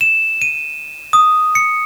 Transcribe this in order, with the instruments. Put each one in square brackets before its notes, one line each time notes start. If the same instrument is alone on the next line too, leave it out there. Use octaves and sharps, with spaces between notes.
[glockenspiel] E7
D#7
D#6
C#7